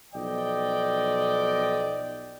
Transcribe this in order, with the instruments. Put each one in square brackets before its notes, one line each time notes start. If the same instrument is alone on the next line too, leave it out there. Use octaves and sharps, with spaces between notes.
[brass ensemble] B1 F3 D5 D#5 G5